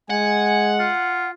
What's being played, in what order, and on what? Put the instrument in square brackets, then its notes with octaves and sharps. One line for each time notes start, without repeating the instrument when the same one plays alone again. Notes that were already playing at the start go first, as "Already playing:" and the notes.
[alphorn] G#3 [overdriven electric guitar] F#5 [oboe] G#5
[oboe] F4